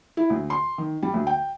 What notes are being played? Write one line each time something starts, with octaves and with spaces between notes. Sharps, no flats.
E4
D2
C6
D#3
G3
D2
G5